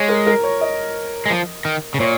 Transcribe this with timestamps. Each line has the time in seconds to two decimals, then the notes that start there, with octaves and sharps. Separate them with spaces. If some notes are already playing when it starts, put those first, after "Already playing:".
Already playing: G#3 C#5
0.09 A#4
0.27 A#4
0.43 C#5
0.61 D#5
1.26 G#3
1.30 F3
1.65 D#3
1.94 C#3
2.00 A#2 C#5